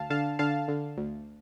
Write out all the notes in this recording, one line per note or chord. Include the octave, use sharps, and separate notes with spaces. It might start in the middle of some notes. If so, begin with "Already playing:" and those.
Already playing: D2 F5 A5
D3 F5 A5
D3 F5 A5
D3
D2